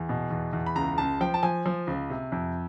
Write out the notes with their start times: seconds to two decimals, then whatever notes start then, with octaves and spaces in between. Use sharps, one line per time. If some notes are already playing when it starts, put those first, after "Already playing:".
Already playing: E2
0.09 B2
0.31 E2
0.53 E2
0.66 B5
0.76 C#2 A#5
0.98 C#2 A5
1.21 F3 G5
1.34 A5
1.43 F3 G#5
1.66 F3
1.87 C#2
2.10 C3
2.32 F2